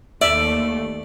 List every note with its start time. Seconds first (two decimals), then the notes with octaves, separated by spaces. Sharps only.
0.21 D#2 A3 D5 E5